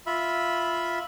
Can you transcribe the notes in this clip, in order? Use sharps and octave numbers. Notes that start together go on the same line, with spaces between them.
F4 E5 B5